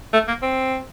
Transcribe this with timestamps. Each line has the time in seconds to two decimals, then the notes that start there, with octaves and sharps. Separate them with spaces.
0.13 A3
0.28 A#3
0.42 C4